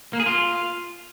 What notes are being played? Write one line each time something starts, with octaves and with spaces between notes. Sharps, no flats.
A#3
G#4
F4